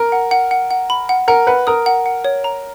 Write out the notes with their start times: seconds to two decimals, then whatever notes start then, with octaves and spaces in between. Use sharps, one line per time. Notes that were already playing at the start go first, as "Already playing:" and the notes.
Already playing: A#4
0.12 F#5
0.31 F#5
0.51 F#5
0.71 F#5
0.90 B5
1.09 F#5
1.28 A#4 F#5
1.47 B4 F#5
1.67 A#4 D#6
1.86 F#5
2.06 F#5
2.25 C#5
2.44 A#5